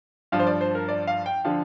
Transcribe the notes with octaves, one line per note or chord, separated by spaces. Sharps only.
G2 F3 F5
C5
D5
C5
A#4
D5
F5
G5
D3 F3 F5